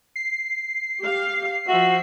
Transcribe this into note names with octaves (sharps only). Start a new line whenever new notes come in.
C7
G4 F5
F3 F#4 E5